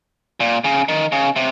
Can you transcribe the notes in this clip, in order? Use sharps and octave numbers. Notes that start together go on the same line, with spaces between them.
A#2
C#3
D#3
C#3
C3